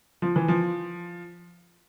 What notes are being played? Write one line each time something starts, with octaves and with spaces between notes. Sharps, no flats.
F3
E3
F3